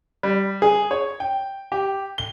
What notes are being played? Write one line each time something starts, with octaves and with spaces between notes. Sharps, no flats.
G3
G#4
C#5
G5
G4
G7